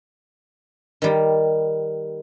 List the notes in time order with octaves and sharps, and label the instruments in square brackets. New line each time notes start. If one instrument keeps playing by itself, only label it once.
[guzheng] D#3 G3